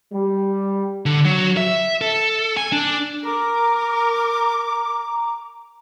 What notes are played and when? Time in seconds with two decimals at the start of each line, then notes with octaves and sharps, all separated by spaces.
0.12 G3
1.06 D3
1.25 F#3
1.57 E5
2.01 A4
2.57 G#5
2.73 D4
3.25 A#4 A#5 D6